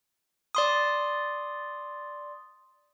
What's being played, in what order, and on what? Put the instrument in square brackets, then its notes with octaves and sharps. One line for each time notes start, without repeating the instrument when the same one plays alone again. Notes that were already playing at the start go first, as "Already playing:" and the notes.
[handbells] D5 C6 D#6